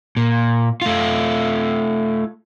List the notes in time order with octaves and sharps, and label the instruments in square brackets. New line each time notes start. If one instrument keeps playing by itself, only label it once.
[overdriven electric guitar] A#2
A3 F4